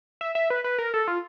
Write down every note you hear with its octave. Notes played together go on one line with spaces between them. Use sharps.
E5
E5
B4
B4
A#4
A4
F4